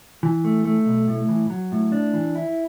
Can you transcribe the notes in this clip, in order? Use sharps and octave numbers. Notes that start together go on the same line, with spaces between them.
E3
A3
A3
B1
A2
E3
F#3
A2
D4
E3
E4